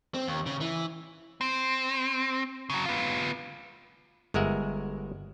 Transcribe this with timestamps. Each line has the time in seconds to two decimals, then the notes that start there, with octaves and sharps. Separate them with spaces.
0.14 C4
0.27 D#2
0.46 C#3
0.61 E3
1.41 C4
2.70 C#3 F#3
2.86 B3 F4
4.34 G1 G#3 A#4 E5 F#5